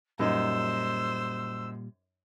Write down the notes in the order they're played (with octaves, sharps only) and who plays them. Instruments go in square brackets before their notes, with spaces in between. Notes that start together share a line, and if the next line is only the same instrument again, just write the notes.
[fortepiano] F#2 D#4 [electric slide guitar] A#2 G3 [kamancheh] C5 [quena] E6